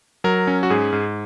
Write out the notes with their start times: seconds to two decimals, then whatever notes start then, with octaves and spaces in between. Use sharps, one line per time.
0.24 F#3 A#4
0.47 C#4
0.63 F#4
0.70 G#2 G#4
0.93 G#2